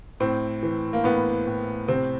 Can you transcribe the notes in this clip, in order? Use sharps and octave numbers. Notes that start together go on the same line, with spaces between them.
A2 C4
E3
A#3
A2 B3
A2
C3 C4